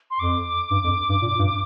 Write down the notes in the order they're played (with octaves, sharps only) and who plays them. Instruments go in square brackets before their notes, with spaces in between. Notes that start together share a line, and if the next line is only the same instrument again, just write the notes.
[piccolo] C6
[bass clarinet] F2 [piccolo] D6
[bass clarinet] G2
F2
G2
A#2
G2